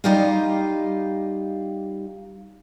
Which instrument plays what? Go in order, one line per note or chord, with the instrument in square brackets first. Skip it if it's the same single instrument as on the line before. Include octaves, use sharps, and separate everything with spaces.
[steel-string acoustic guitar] G3 D#4 F4 G4 D#5 F5